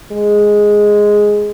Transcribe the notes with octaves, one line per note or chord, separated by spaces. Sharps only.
G#3